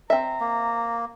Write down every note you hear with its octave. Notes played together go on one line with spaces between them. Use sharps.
C4 E5 A#5
A#3